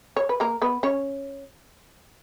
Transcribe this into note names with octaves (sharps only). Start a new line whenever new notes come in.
C#5
B4
A#3 A#4
B3 B4
C#4 C#5